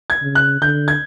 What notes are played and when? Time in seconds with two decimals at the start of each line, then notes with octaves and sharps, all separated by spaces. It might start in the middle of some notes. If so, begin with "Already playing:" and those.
0.10 G#6
0.22 C#3
0.35 F#6
0.61 D3 G6
0.88 G#6